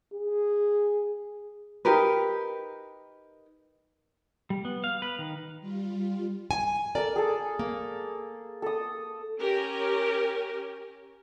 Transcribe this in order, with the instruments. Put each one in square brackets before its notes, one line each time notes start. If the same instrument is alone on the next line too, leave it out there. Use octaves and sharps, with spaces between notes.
[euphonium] G#4
[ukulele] D#4 G4 A#4 B4
[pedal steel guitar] G3
B3
F5
B4
D#3
[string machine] G3 F4
[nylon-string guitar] G#5
[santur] A4 A#4 [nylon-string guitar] D5
[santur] G#4 A4
[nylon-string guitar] A#3
[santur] A4 D#6
[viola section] C#4 G4 A#4